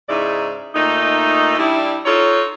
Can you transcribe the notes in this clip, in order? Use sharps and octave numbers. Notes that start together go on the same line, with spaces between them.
G#2 C#3 D#4 E4 D5
A#2 A3 D#4
G3 D4 E4
D#4 F4 A4 C#5